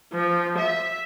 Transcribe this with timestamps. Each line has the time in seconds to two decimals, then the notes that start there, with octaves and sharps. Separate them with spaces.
0.13 F3
0.59 E5